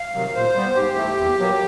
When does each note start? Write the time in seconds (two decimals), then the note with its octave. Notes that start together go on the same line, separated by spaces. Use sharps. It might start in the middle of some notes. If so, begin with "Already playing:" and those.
Already playing: F5
0.14 C3 D#3 F#3
0.35 A#2 C5
0.55 G3 B3
0.75 G#2 G4
0.96 E3 A3
1.17 E2
1.38 B2 F#3 A#3